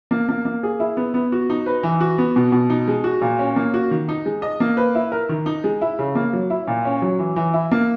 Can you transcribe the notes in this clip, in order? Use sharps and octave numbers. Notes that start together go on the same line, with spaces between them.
A#3
A#3
A#3
G#4
E4
B3
B3
F#4
D#4
B4
E3
F#4
B3
B2
B2
D#4
G#3
F#4
A#2
C#4
A#3
F#4
D#3
D#4
G#3
D#5
A#3
B4
E4
A#4
D#3
D#4
G#3
E4
C#3
A#3
F#3
E4
A#2
C#4
F#3
E3
E3
E4
A#3